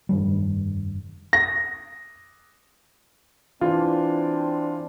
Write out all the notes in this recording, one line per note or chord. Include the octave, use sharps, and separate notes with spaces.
F1 G2 D#3 G3
A#6
E3 C4 D4 F4